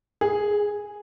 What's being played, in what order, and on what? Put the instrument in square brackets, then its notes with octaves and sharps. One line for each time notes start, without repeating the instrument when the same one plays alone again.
[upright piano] G#4